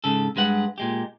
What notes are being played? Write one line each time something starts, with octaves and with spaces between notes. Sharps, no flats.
G#2 C#3 A4
G2 G#3 B4 F#5
A#2 G#3 G4